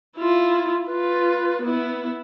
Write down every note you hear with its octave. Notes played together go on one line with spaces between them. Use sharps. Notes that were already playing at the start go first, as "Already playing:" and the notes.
E4 F4
F4 B4
B3 E4